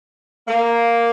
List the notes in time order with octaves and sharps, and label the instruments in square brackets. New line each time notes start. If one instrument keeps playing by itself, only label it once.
[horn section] A#3